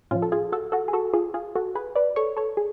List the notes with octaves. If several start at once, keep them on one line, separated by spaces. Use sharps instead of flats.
A2 F3 C#4 F4
A4
F4 G#4
F#4 A4
F#4 A4
G#4
F#4 A4
F4 G#4
F4 G#4
F#4 A4
G#4 B4
B4 D5
A4 C#5
A4 C#5
G#4